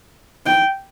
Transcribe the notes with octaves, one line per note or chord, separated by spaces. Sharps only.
G5